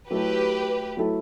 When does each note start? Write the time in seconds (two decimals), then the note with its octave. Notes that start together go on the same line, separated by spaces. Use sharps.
0.10 F#3 A3 E4 G4 A4 B4
0.97 F#3 A3 E4 A4